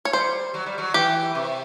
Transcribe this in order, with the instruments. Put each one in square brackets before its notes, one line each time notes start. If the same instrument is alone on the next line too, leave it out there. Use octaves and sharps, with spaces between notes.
[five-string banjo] C#5
[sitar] G3 [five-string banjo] C5
[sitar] F#3
G3
F#3
[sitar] E3 [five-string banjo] G4
[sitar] C3